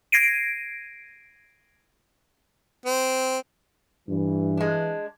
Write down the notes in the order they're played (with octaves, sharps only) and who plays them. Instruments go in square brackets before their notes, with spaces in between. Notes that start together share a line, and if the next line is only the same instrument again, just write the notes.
[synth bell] G#6 A#6 C7 D7 D#7
[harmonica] C4
[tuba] G2 [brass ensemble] E3
[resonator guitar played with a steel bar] G#3 D4